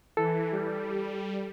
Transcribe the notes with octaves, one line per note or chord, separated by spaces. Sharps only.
E3 A4
G3